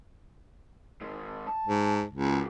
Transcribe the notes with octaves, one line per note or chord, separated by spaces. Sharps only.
D#3 G#3
A5
G#2
C#2
F#4 G#4